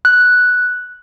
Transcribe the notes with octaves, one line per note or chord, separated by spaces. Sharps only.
F#6